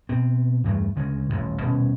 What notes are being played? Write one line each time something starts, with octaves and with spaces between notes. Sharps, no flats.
B2 C4
E2 G2 E3 A3
D2 C#3 G#3
D#1 A1 F#2
D#1 B2 C4 C#4